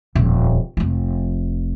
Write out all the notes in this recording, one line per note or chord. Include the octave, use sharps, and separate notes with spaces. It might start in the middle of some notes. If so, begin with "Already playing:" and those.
D#1 F2
F1 A3